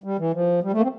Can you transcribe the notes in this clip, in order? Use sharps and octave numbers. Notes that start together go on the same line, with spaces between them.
G3
E3
F3
G3
A3
A#3
C4